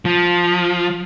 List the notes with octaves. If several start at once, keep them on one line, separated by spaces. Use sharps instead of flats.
F3